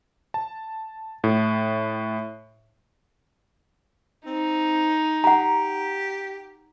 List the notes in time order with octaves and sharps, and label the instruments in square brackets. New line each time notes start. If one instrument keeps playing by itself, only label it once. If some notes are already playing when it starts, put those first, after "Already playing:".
[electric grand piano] A5
A2
[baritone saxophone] C4 [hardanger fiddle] D#4
[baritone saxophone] G4 [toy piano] F#5 A#5